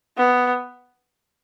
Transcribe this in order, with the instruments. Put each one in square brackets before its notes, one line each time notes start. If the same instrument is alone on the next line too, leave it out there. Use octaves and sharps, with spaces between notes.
[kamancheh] B3